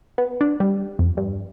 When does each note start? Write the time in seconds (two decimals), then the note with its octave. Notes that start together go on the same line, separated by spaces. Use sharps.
0.18 B3
0.41 D4
0.60 G3
0.99 F2
1.17 G2